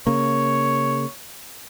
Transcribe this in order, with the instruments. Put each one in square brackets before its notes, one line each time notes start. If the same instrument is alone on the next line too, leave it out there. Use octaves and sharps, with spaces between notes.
[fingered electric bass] C#3 A#3 [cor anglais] C#5